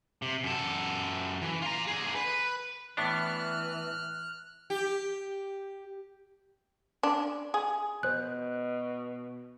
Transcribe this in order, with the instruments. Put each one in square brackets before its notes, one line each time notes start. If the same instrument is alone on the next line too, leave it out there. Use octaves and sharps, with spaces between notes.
[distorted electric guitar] C3
F#2 A4
E3
F4 A#5
D3 G#4
B4
[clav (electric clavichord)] A2 B3 D4 [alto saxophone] E3 [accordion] F6 F#6
[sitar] G4
[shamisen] D4
G#4
[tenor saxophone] B2 [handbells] C5 F#6